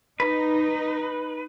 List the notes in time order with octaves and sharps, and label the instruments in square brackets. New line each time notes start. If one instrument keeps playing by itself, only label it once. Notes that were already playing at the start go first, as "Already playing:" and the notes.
[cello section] D#4 [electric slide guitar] B4